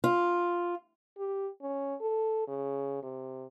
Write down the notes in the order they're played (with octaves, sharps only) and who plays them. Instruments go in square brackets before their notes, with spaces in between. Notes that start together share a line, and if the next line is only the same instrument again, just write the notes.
[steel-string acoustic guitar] F4
[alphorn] G4
C#4
A4
C#3
C3